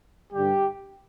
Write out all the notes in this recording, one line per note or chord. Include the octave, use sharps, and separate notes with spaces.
G2 D3 G3 G4